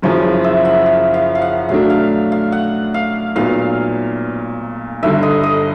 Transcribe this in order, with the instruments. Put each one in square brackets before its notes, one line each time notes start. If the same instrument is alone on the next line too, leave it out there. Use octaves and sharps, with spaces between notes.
[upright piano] F#1 F#2 C#3 F3 [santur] C#5
[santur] E5
F#5
F5
F5
F5
F#5
[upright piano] B2 F#3 A3 D4 [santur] F5
[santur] F5
F5
F#5
F5
[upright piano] B1 A#2 F#3 B3 [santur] F5
[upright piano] G1 G2 D3 [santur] E5
[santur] D#5
D#5